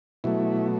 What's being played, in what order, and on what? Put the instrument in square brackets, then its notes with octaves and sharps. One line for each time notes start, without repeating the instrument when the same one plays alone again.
[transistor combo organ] B2 F#3 A3 E4